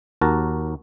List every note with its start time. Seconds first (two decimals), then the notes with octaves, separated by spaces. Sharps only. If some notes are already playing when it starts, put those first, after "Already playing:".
0.21 D#2 F#4 A#4 A5